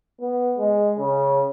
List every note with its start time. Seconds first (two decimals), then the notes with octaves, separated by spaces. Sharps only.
0.21 B3
0.58 G#3
0.98 C#3